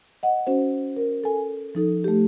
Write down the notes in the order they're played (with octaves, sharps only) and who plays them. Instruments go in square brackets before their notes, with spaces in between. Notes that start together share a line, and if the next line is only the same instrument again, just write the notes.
[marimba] D#5 F#5
C#4 F#4 C5
A#4
A4 G#5
F3 D#4 A4
A3 G4